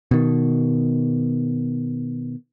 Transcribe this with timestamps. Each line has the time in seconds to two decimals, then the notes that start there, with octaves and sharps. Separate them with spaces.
0.11 B2 D#3